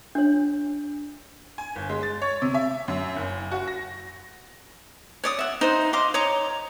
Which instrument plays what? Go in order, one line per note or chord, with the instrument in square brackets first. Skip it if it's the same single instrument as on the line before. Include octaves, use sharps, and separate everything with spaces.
[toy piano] D4 C#5
[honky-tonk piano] G#5
G1
G#3
A6
C#5
C3
E5
F#2
F#1
F#4
A#6
[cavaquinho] C#5 D5 D#6
E5 F#5
D#4 C5 F#5
D#5 F5 C6 D6
C#5 D#5 A#5 D6